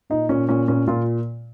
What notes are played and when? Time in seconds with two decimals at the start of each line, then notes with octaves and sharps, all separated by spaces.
0.10 A#2 D#4
0.29 A#2 C#4
0.49 A#2 C#4
0.68 A#2 C#4
0.88 A#2 F4